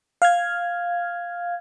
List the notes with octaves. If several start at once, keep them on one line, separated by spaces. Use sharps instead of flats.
F5 F6 G#6